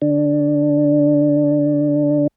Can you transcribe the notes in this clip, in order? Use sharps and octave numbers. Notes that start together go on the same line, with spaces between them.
D3 D4